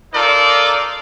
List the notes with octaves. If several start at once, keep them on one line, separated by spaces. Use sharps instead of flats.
D#4 F4 A4 A#4 D5